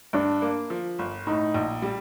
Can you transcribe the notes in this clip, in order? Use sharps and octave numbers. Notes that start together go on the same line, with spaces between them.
G2 D4
A#3
F3
G1
A2 D#4
A#1
G3